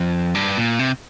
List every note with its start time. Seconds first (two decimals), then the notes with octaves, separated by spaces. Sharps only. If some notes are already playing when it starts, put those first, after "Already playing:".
Already playing: F2
0.35 G2
0.58 A#2
0.79 C3